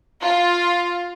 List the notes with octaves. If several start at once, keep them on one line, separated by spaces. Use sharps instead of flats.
F4